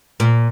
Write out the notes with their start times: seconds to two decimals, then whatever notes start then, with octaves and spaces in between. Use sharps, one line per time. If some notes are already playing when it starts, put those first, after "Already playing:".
0.20 A#2